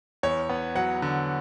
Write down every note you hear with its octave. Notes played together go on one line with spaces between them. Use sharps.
E2 C#5
B3
F#3 F#5
D3